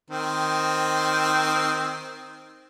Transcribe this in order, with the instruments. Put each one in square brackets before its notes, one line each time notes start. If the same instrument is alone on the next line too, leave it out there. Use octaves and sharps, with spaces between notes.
[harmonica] D#3 C4